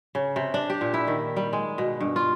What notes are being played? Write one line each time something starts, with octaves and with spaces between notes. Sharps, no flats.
C#3
C3
D4
G4
A#2
E4
D#3
G3
G#3
B2
G2
F4